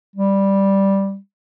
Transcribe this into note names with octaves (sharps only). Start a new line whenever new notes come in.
G3